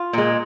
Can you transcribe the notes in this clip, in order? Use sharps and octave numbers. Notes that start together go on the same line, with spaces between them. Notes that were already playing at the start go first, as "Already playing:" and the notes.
Already playing: F4
A#2 G#3